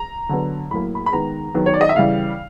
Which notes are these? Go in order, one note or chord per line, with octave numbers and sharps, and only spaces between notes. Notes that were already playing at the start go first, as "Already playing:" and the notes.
Already playing: A#5
D3 F#3 B3
A2 F#3 A#3 B5
B5
B5
D#3 G#3 B3 A#5
D#3 F#3 B3
C#5
D5
D#5
E5
C#3 E3 G3 F5